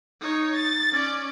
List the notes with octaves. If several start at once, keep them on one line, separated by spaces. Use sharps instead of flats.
D#4 C#5
A6
C#4 D5